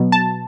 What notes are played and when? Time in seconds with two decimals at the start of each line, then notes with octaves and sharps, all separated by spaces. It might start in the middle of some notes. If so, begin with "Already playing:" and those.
Already playing: B2 F#3 B3
0.12 A5